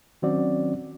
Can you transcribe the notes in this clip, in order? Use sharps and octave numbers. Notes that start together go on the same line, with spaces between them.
D#3 F#3 C4 C#4 F#4 D5